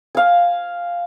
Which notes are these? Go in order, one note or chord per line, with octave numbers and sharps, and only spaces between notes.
F5 G#5